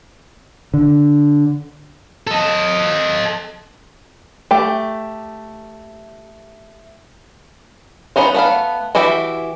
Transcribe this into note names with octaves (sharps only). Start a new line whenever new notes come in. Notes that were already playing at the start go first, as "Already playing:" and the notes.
D3
A4 D#5
A3 G4
B3 C#4 D#4 C5
A3 B3 F5
E3 F#4 G4 E5